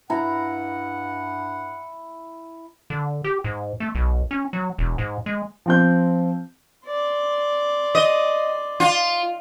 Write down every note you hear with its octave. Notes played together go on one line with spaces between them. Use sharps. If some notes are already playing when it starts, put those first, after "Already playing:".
G2 E4 F#5 A#5
D3
G4
G#2
A3
B1
C#4
F#3
E1
G#2
G#3
F3 C4 G6
D5 C6
D#5
F4